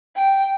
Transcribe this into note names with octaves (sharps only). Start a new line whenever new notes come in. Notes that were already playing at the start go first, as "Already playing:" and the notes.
G5